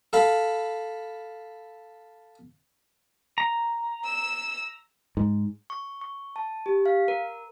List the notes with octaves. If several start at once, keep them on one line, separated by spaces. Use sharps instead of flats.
A4 F5 B5
A#5
E6 E7
G#2
C#6
C#6
A5
G4
F5
A#4